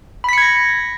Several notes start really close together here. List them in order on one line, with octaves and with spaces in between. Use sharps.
B5 B6 C#7 G#6 A#6